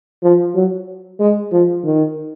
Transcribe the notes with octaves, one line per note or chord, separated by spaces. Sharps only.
F3
F#3
G#3
F3
D#3